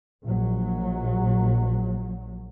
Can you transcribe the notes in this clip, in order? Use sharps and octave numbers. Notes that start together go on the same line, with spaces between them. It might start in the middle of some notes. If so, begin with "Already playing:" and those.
A#1 F#3